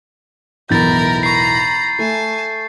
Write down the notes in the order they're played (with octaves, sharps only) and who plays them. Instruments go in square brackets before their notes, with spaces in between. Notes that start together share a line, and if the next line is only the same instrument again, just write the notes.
[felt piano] B1 E2 A2 [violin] A#4 B5 [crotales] G6 A6
[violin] A#5 B5 [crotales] C#6 C7
[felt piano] A3 [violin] G#5 A5